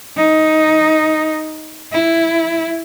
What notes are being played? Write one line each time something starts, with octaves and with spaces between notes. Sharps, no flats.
D#4
E4